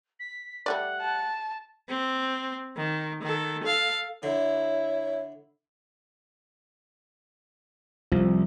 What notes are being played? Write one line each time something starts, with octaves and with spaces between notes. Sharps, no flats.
B6
G3 A3 D5 F#5
A5
C4
D#3
D#3 A4
A4 F5
D3 E4 C#5
C2 F3